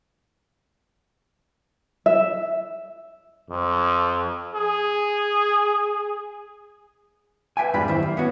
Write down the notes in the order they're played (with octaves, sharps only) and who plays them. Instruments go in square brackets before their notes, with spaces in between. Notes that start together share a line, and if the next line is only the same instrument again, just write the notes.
[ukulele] E5
[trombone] F2
G#4
[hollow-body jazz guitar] B4 E5 G5 G#5
F2 G#2 D4 F4 G4 B5
F#2 D#3 E4 C5 E5
A#3
B3 C#4 F#4